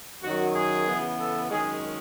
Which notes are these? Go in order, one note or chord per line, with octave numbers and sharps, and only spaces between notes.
F#2 D#3 F#3 F#4
G#4
C#3 E3 B3
A4
F#2 D#3 G#3 C#4 G#4